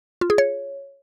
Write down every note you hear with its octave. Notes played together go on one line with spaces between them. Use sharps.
F4
G#4
C#5